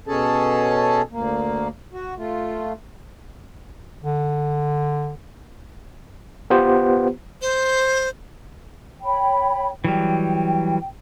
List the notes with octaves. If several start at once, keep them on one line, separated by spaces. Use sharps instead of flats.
B2 C#4 G#4 A4 A5
D2 A#3
F#4
A3 F4
D3
B3 F4 G4 B4 C5
C5
C#5 G5 B5
E3 F#3 G3 G5